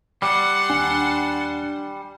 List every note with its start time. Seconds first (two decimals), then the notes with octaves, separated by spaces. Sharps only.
0.22 G3 F#5 A5 C6
0.70 D#2 D4 G#5